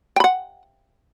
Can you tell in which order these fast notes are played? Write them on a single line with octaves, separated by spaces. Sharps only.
G5 B5 F#5